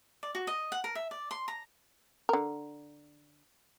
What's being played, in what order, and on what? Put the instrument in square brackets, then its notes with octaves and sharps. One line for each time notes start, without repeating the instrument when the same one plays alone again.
[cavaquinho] D5
F#4
D#5
F#5
A#4
E5
D5
C6
A#5
[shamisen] D3 A#4